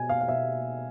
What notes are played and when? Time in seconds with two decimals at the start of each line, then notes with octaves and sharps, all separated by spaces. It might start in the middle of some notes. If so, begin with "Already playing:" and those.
Already playing: B2 G#5
0.09 F5
0.21 F5
0.28 B2 E5